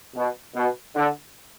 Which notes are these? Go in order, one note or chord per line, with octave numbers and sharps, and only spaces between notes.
B2
B2
D3